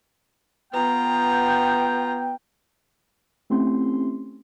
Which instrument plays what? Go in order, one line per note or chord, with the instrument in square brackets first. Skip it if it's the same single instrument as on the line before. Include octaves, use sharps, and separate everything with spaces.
[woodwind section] B3 G5 [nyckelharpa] F4 A#5
[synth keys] A3 C4 C#4 E4 G4 C6